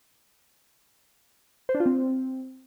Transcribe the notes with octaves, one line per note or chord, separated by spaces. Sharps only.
C5
D4
F4
C4